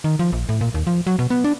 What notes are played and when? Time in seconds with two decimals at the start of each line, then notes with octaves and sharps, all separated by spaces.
0.04 D#3
0.19 F3
0.33 A#1
0.49 A2
0.61 A#2
0.74 D#2
0.87 F3
1.07 F#3
1.19 B2
1.30 B3
1.44 D4